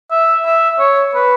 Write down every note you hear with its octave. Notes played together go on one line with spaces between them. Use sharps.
E5
E5
C#5
B4